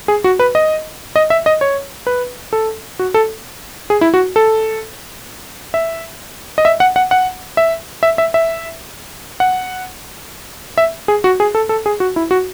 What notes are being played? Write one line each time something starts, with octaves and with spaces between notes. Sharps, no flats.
G#4
F#4
B4
D#5
D#5
E5
D#5
C#5
B4
A4
F#4
A4
G#4
E4
F#4
A4
E5
D#5
E5
F#5
F#5
F#5
E5
E5
E5
E5
F#5
E5
G#4
F#4
G#4
A4
A4
G#4
F#4
E4
F#4